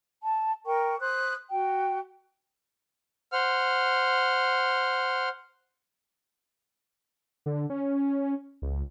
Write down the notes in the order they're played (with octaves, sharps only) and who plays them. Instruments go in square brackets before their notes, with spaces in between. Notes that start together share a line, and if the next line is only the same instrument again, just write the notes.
[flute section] A5
A#4 G5 C#6
C5 D#6 F#6
F#4 G5
[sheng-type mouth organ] C5 F#5 F6
[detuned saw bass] D3
C#4
C#2